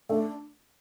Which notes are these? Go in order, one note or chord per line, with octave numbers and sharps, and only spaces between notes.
A3 D4